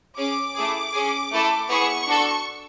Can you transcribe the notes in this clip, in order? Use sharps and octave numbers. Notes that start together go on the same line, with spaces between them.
C#4 G#4 D6
A3 E4 G#4
C#4 G#4
A3 E4 A4
B3 E4 G#4 C#6
D4 F#4 A4